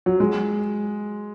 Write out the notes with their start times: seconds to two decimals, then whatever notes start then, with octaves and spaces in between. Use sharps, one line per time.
0.06 F#3
0.20 G#3